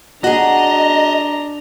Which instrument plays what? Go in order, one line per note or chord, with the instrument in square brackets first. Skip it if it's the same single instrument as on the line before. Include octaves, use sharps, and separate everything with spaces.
[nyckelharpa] D4 A#5 [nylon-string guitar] F#4 G#4 [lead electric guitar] D#5